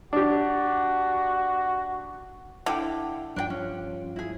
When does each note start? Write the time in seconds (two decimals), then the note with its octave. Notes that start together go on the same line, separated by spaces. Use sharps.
0.13 D4 F#4 G4
2.66 D3 E4 F5 G5
3.36 G2 F3 D4 B4 G5
3.50 C#4
4.16 E4 G#4